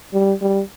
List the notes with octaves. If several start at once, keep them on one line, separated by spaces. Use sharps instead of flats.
G3
G3